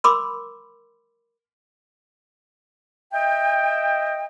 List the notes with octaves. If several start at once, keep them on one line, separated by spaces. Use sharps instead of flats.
A#4 B5 C6 D6 E6
D#5 E5 G5